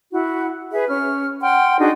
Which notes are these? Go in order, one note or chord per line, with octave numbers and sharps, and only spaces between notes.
E4 F#4
G#4 B4 E5
C#4 F6
F#5 G5 C6 F6
D4 D#4 F#4 G#4